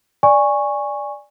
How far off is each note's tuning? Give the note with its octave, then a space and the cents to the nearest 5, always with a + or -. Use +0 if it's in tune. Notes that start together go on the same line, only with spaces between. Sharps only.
D5 +0 G#5 -15 C#6 -5